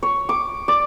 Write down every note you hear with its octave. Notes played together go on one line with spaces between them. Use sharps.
C#5
D6
D5